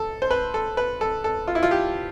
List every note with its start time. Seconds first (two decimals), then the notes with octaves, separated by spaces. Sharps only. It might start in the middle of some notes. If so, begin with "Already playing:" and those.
Already playing: A4
0.22 C5
0.31 B4
0.54 A4
0.77 B4
1.01 A4
1.24 A4
1.47 F4
1.55 E4
1.63 F4
1.71 G4